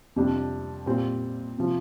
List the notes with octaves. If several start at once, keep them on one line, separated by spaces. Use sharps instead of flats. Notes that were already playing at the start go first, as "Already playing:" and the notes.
F2 C3 G3 D4
A#2 G3 C4
C3 F3